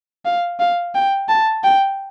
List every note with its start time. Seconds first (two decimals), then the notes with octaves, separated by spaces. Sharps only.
0.25 F5
0.60 F5
0.95 G5
1.29 A5
1.63 G5